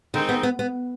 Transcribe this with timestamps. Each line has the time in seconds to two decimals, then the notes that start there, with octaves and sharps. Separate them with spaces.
0.13 D3 D#3 G#3 C4 D#4
0.29 B3
0.43 B3
0.59 B3